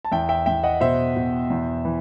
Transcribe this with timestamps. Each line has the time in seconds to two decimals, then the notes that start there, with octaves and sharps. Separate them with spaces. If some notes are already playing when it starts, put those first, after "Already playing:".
0.05 A5
0.12 E2 E5 G5
0.29 E5 G5
0.46 E2 E5 G5
0.63 D#5 F#5
0.80 B2 C5 E5
1.16 B2
1.50 E2
1.85 E3